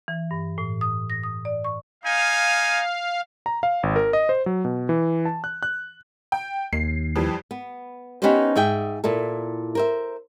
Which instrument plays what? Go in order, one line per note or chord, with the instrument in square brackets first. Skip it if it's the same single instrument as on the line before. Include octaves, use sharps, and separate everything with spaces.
[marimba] E3
G2
A2
D#6
A#6
D#6
D5
C#6
[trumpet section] D#4 G#5 [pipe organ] F5
[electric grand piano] A#5
F5
G#1
A#4
D#5
C5
F#3
B2
E3
A5
F#6
F#6
[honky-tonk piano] G5
[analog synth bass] D#2 [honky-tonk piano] C7
[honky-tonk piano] F2 E3 G3
[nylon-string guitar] B3
B3 C#4 D#4 G4 B4 C5
G#2 G#4 E5 G5
A#2 E4 A4
A#4 C5 E5